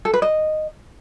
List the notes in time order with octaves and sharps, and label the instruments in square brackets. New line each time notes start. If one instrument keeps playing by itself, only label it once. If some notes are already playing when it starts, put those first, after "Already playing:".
[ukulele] A4
B4
D#5